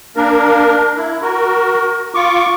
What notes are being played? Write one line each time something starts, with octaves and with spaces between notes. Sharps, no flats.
A#3 D4 A#4
E4
F#4 A#4
F4 C#6 D6